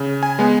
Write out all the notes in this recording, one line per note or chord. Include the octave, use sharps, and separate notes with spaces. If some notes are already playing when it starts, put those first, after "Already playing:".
Already playing: C#3
G#5
G#3 B3